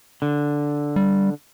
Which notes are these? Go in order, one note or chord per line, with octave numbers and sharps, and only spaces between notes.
D3
G3